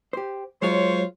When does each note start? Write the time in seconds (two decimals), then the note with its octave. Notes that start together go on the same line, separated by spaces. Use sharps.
0.13 G4 C5
0.62 F#3 G#3 F4 C5 C#5